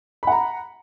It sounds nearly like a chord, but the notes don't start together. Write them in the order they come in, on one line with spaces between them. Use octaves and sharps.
B5 F#5 A#5